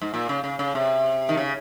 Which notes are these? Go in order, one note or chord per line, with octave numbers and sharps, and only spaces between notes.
G#2
A#2
C#3
C#3
C#3
C3
D#3
C#3